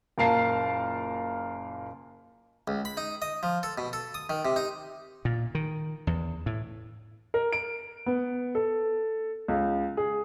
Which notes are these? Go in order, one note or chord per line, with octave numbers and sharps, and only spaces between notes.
F#1 A#2 A#4 F5 A5 C7
C#2
B5
D#4
D#5
F3
A4
B2
A4
D#6
D#3
C3
D#4
A#2
D#3
E2
A2
A#4
D7
B3
A4
C#2
G#4